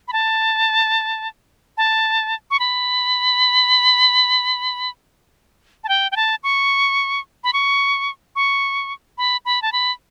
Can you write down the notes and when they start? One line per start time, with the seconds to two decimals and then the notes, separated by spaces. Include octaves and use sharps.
0.08 B5
0.13 A5
1.77 A5
2.51 C#6
2.59 B5
5.84 A5
5.89 G5
6.11 G5
6.16 A5
6.43 C#6
7.44 B5
7.53 C#6
8.36 C#6
9.18 B5
9.45 B5
9.62 A5
9.72 B5